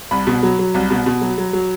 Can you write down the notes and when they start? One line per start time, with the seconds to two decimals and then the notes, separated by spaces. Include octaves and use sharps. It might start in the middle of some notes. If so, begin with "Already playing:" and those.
0.11 C2 B5
0.27 B2
0.43 F#3
0.59 F#3
0.74 C2
0.90 B2
1.06 B2
1.22 F#3
1.38 F#3
1.53 F#3